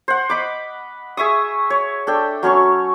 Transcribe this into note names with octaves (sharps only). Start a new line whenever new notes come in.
C5 F#5
D#5 B5 D6
G#4 E5 C#6 D#6
C#5
D4 A4 G5
F#3 C#4 C#5 C#6